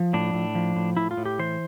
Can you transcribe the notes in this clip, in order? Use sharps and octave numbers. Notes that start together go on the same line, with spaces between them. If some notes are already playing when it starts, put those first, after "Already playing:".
Already playing: F3
A2 D4
A2
F3
A2
A2 E4
F4
A2
G4
E3 C5